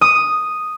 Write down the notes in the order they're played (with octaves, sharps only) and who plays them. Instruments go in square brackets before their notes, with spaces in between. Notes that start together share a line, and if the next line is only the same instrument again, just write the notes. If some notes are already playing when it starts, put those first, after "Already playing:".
[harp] D#6